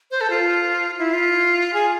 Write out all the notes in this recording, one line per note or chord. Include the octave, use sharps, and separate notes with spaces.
C5
A4
F4
E4
F4
G#4